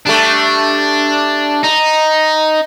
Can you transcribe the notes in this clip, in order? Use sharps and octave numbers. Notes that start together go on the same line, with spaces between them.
G3 A3 D4
D#4